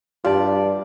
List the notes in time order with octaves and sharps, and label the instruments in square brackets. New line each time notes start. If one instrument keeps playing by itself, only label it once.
[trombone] G2 [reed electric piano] F4 G4 A5 [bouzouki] D5